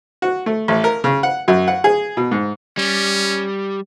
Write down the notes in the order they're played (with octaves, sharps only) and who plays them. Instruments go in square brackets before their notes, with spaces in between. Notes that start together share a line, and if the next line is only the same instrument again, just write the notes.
[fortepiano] F#4
A3
A1
A#4
C#3
F#5
F#2
F#5
G#4
B2
G#2
[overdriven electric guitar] G3 [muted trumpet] C#4